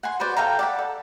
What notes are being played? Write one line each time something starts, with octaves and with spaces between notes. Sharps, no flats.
F#5 G#5 C6
F#4 B4 C5 D5
A4 F5 G5 A#5
D5 F#5 B5
A4